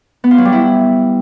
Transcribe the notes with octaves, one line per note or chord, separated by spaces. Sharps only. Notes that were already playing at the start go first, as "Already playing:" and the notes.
B3
F4
F#3
G3
E4